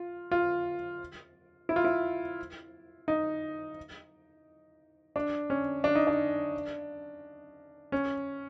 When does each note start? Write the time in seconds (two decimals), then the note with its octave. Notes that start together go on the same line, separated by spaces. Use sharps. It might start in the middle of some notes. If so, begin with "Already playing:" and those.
Already playing: F4
0.31 F4
1.69 E4
1.76 F4
1.85 E4
3.08 D#4
5.16 D4
5.50 C#4
5.84 D4
5.95 D#4
6.07 D4
7.92 C#4